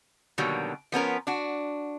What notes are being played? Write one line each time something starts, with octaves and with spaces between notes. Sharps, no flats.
B2 D3 D#3 F#3 G3 A#3
F3 B3 C#4 A#4
D4 F#4